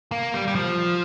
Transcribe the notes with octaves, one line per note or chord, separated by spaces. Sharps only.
A#3
G3
G3
F3